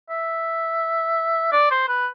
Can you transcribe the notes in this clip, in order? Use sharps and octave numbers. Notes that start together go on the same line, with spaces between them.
E5
D5
C5
B4